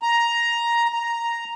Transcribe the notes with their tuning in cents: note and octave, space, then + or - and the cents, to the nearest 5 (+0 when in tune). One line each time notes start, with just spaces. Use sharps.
A#5 +10
A#5 +0